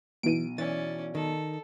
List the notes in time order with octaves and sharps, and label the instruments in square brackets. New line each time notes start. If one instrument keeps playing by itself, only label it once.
[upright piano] B1 D#7 [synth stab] E3 D7
[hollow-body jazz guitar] E3 [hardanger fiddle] C#4 D5 [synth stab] A6
[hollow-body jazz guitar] D#3 [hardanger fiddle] A4